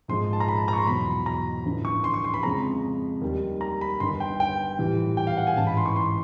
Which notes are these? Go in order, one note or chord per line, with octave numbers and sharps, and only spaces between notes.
A#1 G#2 F3 G#3 C6
A5
A#5
B5
A5
A#5
C#6
C6
E2 B2 F#3 B5
A#5
A1 G2 D3 F3
C#6
C6
C#6
C6
B5
F2 C#3 F3 G#3 A#5
D#2 D#3 G3
A#5
B5
G1 G2 D#3 C6
G5
G5
A#1 A2 E3 G3
G5
F5
F#5
G#5
A1 G#2 E3 A5
B5
C6
C#6
C6